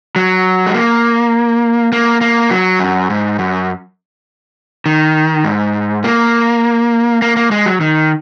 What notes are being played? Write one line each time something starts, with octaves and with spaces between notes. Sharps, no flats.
F#3
G#3
A#3
A#3
A#3
F#3
F#2
G#2
F#2
D#3
G#2
A#3
A#3
A#3
G#3
F#3
D#3